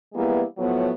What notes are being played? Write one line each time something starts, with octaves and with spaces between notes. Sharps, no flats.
E3 G3 G#3 A#3 B3 E4
A2 F3 F#3 B3